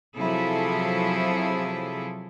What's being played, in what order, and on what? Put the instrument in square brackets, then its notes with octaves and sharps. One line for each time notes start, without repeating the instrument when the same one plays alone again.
[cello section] C3 F3 F#3 E4 G#4 A4